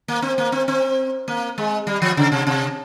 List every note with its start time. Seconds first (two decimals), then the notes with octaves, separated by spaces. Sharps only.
0.08 A#3
0.22 C4
0.38 A#3
0.52 C4
0.68 C4
1.28 A#3
1.58 G#3
1.87 G3
2.02 F3
2.17 C#3
2.32 C3
2.47 C3